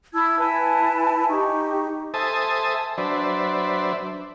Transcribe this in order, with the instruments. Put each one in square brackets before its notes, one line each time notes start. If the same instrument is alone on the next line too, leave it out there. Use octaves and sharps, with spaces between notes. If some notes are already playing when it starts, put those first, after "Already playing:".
[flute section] E4 A5 E6 G#6
E4 B4 G#5 A5
D#4 G4 C#6
[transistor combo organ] A4 C5 E5 G#5 A5 D#6
F#3 D4 B4 C5 D5 E5